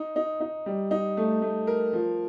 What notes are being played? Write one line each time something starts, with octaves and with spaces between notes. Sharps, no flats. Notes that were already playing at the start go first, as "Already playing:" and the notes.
Already playing: D#4
D#4
D#4
G3
D#4
A3
A3
A#4
F3